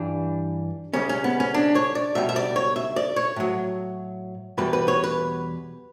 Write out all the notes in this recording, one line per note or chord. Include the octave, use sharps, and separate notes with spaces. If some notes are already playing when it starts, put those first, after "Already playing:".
Already playing: G2 E3 G3 D4
C#2 C#3 G3 C#4
C#4
B3
C#4
D4
C#5
D5
C#2 B2 G3 E5
E5
D5
C#5
E5
D5
C#5
A2 F#3
E2 B2 G3 B4
B4
C#5
B4